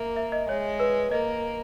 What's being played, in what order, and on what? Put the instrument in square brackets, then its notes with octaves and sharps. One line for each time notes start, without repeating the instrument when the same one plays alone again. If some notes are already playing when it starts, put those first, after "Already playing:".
Already playing: [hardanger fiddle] A#3 [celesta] E5
[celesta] E5
D#5
[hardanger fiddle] G#3 [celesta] C#5
[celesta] B4
[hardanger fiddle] A#3 [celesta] D#5